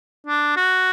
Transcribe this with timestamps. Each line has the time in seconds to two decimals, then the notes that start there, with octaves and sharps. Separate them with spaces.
0.27 D4
0.56 F#4